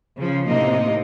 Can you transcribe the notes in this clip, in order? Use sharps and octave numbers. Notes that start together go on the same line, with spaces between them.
C#3 F3
A2 C3 A#3 D#4 D#5